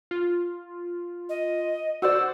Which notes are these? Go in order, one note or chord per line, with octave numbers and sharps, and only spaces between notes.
F4
D#5
F#4 C5 D5 E6